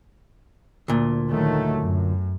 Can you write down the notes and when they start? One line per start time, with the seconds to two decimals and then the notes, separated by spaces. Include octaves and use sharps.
0.88 D2 A#2
1.31 D#3 F#3 A3
1.78 F#2